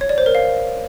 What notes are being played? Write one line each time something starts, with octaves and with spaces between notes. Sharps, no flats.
C#5
D5
C5
A#4
F5